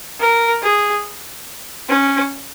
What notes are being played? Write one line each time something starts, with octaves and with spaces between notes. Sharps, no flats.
A#4
G#4
C#4